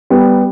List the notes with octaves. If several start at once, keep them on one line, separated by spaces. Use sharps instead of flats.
G3 B3